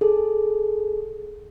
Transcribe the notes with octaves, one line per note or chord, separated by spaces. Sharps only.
G#4 A4